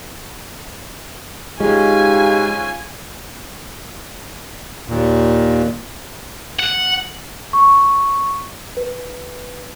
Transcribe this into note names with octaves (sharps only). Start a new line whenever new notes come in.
G#2 G#3 C#4 D#4 F4 G4 G#5
D#2 A#2
F#5
C#6
B4